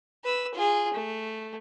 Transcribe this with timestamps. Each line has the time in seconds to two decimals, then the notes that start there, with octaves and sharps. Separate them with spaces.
0.24 B4 E6
0.54 F4 G#4
0.94 A3